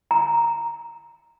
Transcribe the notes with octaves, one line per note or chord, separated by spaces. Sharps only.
A#5